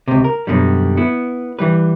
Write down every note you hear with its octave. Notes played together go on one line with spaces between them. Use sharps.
C#2 C3
A#4
F#2 B2 D3 G3
B3 E4
E3 G3 B4